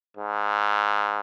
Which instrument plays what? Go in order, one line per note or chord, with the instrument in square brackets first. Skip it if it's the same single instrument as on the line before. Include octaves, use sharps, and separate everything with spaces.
[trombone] G#2